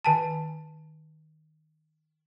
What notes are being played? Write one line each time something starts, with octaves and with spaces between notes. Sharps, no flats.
D#3 G#5 A5